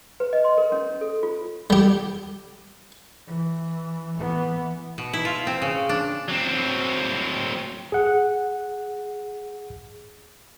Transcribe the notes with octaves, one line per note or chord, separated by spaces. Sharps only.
B4
D#5
C6
A#4
C#4
A4
F4
G3 G4
E3
E3 B3
B2
E4
F4
C4
C#3
D4
F#3 C4
G#4 F#5